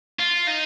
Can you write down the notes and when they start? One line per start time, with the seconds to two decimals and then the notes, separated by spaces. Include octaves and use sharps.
0.20 F4
0.47 D#4